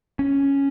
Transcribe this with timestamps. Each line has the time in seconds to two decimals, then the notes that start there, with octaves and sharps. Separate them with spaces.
0.19 C#4